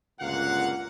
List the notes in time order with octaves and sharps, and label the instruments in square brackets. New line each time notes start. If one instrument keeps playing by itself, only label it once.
[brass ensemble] G1 C#2 A#2 A#3 F5 F#5